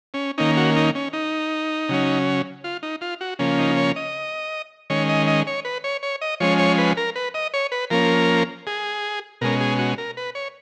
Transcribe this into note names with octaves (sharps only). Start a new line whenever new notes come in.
C#4
D#3 A#3 C#4 D#4
F#4
D#4
C#4
D#4
C#3 F#3 C#4
F4
D#4
F4
F#4
C#3 F3 A#3 C#4
D#4
C#5
D#5
D#3 G#3 C#4 C#5
D#5
D#5
C#5
B4
C#5
C#5
D#5
F3 G#3 C#4 C#5
C#5
B4
A#4
B4
D#5
C#5
B4
F3 A#3 C#4 A#4
G#4
B2 G#3 C#4 A#4
G#4
F#4
A#4
B4
C#5